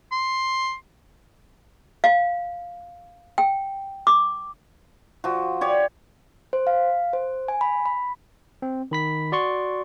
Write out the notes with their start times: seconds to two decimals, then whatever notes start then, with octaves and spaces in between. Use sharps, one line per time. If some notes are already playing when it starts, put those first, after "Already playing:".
0.12 C6
2.04 F5
3.38 G5
4.07 D6
5.24 F3 F#4
5.61 G4 C#5 D5
6.53 C5
6.67 F5
7.13 C5
7.48 G#5
7.61 B5
7.86 B5
8.62 C4
8.91 D#3 B5 B6
9.32 F#4 D5 C6 C#6